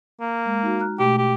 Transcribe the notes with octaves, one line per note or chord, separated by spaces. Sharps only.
A#3
G#3
D#4 F#4
A#5 F6 F#6
B2 A3 G4
G4